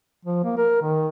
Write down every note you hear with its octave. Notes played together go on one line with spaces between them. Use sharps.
F3
A#3
A#4
D#3